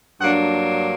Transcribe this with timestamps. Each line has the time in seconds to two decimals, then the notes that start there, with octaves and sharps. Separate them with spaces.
0.21 G2 F#3 A#3 D4 F#5